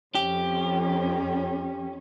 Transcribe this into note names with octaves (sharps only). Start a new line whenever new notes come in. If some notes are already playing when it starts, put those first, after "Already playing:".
F2 C#4 G4